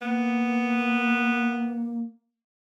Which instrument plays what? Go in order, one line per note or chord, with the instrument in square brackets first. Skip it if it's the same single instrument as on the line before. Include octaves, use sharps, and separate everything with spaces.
[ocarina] A#3 [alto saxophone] B3